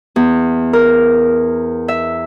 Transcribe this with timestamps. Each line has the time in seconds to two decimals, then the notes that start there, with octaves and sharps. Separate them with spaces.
0.16 E2
0.73 A#4
1.88 E5